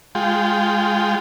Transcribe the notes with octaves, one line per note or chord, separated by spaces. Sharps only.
G#3 F4 G5